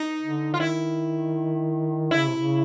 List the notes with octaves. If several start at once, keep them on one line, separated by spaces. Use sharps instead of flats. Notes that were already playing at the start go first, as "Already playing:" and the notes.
Already playing: D#4
D3
F4
D#3 E4
D3 E4
C#3
C3
C#3